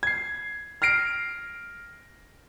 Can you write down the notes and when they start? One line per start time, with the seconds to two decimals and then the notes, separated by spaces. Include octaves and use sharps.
0.03 G#6 C7
0.82 F6 A#6 C7 D7